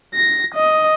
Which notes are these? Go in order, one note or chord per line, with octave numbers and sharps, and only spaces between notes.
A#6
D#5